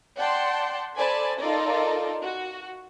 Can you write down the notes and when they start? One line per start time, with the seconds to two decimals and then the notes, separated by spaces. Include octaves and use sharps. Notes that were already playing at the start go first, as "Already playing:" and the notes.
0.17 D5 F#5 G5 A5 C6
0.98 A4 C5 D5 G#5 A5 B5
1.39 D#4 F4 A4 A#4 D5 D#5
2.23 F#4